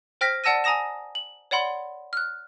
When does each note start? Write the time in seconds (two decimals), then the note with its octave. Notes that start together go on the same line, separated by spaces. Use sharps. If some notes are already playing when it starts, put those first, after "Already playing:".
0.21 C5 G5 F6 A#6 B6
0.44 D5 F#5 A5 E6 A#6 D#7
0.64 G#5 A#5 D#6 A#6 E7
1.15 F#7
1.51 C#5 D5 F#5 B5 C6
2.13 F6 F#6